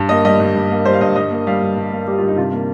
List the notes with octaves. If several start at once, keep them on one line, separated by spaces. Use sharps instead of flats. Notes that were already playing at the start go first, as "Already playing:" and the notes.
Already playing: G2
A#3 D#5
G3 D#5
G2
G2
A#3
G3 C5
F5
G2 D#5
G2 D#5
A#3
G3 F5
G2
G2
A#3
G3 G4
F4
G2
D#4
C3 F4
A#3